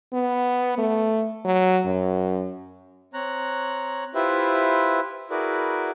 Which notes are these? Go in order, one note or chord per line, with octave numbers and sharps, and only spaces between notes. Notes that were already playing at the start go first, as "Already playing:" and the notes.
B3
A3
F#3
F#2
C4 C#5 A#5 F#6
E4 F4 G4 B4 C5 E5
E4 F#4 G#4 A#4 B4 D5